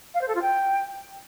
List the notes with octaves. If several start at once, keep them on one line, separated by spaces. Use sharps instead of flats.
F5
C5
A4
F4
G5